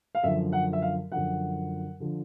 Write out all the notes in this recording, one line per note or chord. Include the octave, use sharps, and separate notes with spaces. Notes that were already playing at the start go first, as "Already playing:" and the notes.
F5
F#2 D3 F3 E5
F#5
E5
F5
F#2 D3 F3 F#5
D3 F3